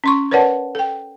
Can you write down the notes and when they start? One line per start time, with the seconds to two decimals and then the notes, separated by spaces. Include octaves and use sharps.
0.04 C#4 C6 C#6
0.31 A#4 B4 C#5 D5 F#5 A5
0.75 A4 G5